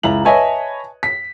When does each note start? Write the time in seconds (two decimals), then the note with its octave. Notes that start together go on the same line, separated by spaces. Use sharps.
0.03 C#2 E4 A#5 F#7
0.25 B4 C#5 D#5 E5 G#5 A5
1.03 B6